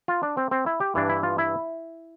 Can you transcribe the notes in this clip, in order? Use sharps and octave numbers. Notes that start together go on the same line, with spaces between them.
F4
D4
C4
C4
E4
G4
G2 E3 D4
E4
F4
E4